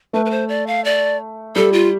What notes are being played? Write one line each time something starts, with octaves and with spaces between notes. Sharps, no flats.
A3 B4
B4
C5
D5
F5
D5
G3 A4
F4